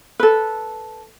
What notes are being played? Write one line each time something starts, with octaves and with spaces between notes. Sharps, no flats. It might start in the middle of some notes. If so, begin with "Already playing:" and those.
A4 B4